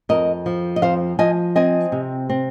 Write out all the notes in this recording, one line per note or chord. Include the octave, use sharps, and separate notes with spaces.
F2 A#4 D#5
F3
D#5
F2 C5 F5
F3 D#5 G#5
C4 D#5 G#5
C3
C4